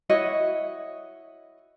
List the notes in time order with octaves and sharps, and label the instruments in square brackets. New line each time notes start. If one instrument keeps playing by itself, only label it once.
[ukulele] E4 F#4 C#5 D#5